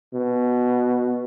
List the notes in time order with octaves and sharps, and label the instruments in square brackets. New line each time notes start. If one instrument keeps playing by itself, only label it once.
[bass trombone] B2